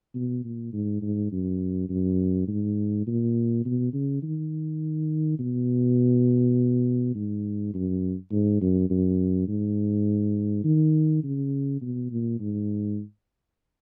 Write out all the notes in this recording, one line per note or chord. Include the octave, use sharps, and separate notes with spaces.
B2
A#2
G#2
G#2
F#2
F#2
G#2
A#2
B2
C#3
D#3
B2
G#2
F#2
G#2
F#2
F#2
G#2
D#3
C#3
B2
A#2
G#2